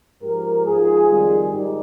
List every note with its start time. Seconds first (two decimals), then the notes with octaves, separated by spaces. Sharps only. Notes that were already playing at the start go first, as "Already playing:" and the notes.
0.21 G#2 F3 G4 A#4
0.65 G#2 F3 F4 G#4
1.07 F2 D#3 G3
1.51 G#2 D#3 G3 D#4 G4